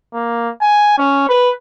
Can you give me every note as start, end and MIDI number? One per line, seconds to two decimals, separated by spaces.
0.13 0.50 58
0.61 0.93 80
0.98 1.26 61
1.29 1.51 71